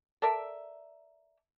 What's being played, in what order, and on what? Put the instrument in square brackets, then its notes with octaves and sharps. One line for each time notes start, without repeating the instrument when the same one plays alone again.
[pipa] A4 A#4 D5 E5